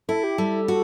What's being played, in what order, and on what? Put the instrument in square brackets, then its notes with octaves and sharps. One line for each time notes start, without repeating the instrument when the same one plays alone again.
[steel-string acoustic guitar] E4 [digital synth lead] A4
[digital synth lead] G4
[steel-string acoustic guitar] G3 [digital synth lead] A4
[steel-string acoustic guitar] F#4